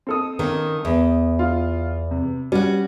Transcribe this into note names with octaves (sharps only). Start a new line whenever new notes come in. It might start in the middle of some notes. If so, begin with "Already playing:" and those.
C4 A4 D#6
D#3 A#3 C#4
E2
F4
C3
G3 C#4 F#4